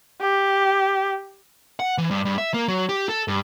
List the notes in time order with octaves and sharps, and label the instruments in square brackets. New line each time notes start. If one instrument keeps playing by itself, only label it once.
[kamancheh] G4
[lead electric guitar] F#5
E3
G2
G2
E5
A#3
F#3
G4
A4
G2